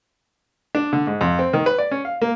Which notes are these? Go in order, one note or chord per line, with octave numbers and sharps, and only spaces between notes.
D4
D3
G#2
F2
C4
D#3
B4
D5
C#4
F5
A#3